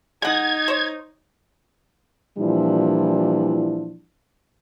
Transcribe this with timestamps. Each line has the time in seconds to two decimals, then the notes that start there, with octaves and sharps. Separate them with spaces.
0.22 G#3 D#4 F#5 G#6
0.68 C5 C#5
2.38 A#2 E3 F3 G3 D4 E4